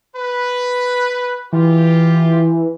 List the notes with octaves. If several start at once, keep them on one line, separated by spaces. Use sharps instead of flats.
B4
E3 F4 G4